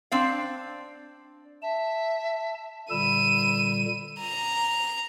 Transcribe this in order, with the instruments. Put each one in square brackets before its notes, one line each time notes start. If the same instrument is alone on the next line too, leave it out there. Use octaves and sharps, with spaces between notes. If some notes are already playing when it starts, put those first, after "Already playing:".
[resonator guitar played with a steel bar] C4 D4 F5
[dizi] E5 [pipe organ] A5
[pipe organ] A#2 D3 G3 [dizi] B5 [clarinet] E6 [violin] D#7
[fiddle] A#5